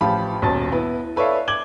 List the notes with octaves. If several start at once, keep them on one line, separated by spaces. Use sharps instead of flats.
A1 F3 F4 G4 A5 B5
D#1 B1 C#4 A5 A6
B3 E4 B4
A4 B4 C#5 D5 E5 F5
D6 G#6 F#7 G7